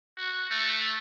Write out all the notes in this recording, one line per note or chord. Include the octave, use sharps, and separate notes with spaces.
F#4
A3